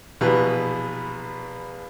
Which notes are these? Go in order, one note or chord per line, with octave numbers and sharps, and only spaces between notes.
A#1 B2 E3 G3 B4